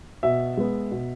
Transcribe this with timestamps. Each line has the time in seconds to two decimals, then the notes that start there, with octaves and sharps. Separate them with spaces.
0.23 B2 E5
0.57 G#3 B3
0.91 B2